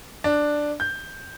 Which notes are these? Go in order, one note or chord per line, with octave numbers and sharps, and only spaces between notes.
D4
G6